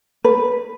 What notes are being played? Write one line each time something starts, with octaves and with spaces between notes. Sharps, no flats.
B4